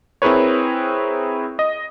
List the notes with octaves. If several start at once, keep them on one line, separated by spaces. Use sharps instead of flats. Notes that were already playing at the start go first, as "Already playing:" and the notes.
C4 E4 G#4 A#4 B4 C#5
D#5